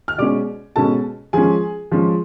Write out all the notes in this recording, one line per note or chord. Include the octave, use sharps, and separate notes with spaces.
F6
B2 G#3 C#4 D5 D6
B2 G#3 C#4 A4 A5
F3 G#3 C#4 G#4 G#5
F3 G#3 C#4